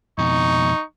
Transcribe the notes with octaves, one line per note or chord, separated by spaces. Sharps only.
F2 B2 D#4 C#6